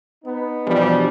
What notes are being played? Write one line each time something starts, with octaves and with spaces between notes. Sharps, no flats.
B3 D#4
B2 E3 F3 G3 D4